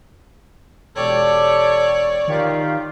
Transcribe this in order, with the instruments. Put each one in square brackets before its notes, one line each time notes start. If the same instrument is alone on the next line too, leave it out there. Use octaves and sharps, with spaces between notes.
[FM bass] E1 [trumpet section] G4 A4 [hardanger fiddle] C#5 D5
[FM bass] D#3 [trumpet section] F4 G4